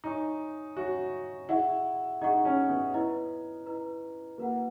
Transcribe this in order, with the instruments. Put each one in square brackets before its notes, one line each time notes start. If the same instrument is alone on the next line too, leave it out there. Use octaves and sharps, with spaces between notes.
[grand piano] D#4 [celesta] C#5 E5 G#5 C#6
[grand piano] F#4 [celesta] C#5 E5 G#5 C#6
[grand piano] E4 [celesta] G#4 D#5 F#5 C#6
[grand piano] D#4 [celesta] G#4 D#5 F#5 C#6
[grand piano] C#4
B3
[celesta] E4 B4 D#5 A#5
E4 B4 D#5 A#5
[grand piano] A#3 [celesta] F#4 B4 F#5